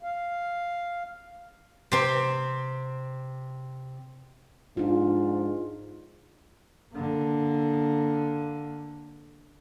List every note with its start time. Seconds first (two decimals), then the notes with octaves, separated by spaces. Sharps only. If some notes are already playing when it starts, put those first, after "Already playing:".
0.03 F5
1.92 C3 C4
4.77 G#2 D4 F4
6.94 D3 A#3